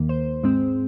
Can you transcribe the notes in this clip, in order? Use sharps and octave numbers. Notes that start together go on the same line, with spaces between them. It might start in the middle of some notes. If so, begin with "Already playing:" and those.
Already playing: D#2 D#3 A#3
C5
G#2 G#3 C4